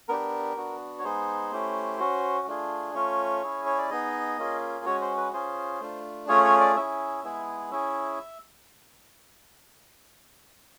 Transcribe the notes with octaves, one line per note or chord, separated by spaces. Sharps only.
B3 D4 G4 A#4
B3 D4 F#4
C#5
G#3 B3 D#4 G#4 C5
A3 C#4 E4 G4
C#4 F#4
A3 D4 F4 G#4
A3 C#4 F4 C#5
C#4 E4 G#4
C#5
D5
B3 D#4 G#4 D#5
A#3 C#4 F4 G#4
G#3 C#4 F#4 C#5
C5
B4
C#4 F4 G#4 C5
A3 D4 F4
A3 C#4 F4 G#4 C#5
C#5
D5
C#4 E4 G#4 E5
G#3 B3 E4 G#4
C#4 E4 G#4 E5